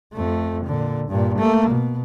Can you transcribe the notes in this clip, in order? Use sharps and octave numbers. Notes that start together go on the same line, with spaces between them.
F2 A3
A#2 D3
G2 A#2
A3 A#3
B2